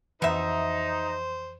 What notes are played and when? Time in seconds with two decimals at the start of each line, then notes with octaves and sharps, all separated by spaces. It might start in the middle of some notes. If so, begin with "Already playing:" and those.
0.22 F2 B2 E3 D#4 C5 E5